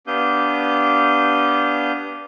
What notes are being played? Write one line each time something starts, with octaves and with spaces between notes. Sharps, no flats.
B3 D4 G4 F5 D#6 G6